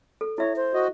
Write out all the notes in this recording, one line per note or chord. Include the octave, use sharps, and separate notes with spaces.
A4
E4 C#5 E5
C5
F#4 D#5